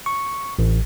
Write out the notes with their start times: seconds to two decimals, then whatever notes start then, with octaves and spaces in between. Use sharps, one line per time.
0.06 C#6
0.59 A1